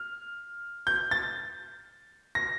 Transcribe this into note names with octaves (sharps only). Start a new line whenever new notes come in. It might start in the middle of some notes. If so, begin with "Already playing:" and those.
Already playing: F6
G6
A6
A#6